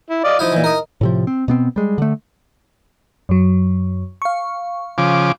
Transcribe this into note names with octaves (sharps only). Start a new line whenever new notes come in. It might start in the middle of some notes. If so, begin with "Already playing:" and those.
E4
D5 D#5 F5
F3 D#4 E4 D#5 F5
A#2 E3
A#4 D#5
A2 C3 F3
C4
B2 B3 C4
G3 G#3
D3 A3
F#2 F#3
F5 C#6
C#3 F3 D6